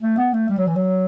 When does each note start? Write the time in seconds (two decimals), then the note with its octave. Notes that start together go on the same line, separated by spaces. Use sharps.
0.02 A3
0.17 B3
0.33 A3
0.49 G3
0.58 F#3
0.67 E3
0.76 F#3